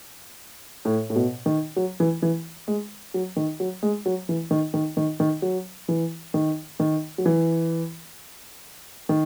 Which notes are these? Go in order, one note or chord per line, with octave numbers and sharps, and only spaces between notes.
A2
A2
B2
D#3
F#3
E3
E3
G#3
F#3
D#3
F#3
G#3
F#3
E3
D#3
D#3
D#3
D#3
F#3
E3
D#3
D#3
F#3
E3
D#3